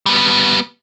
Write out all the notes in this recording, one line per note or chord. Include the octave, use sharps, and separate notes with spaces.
G3 B3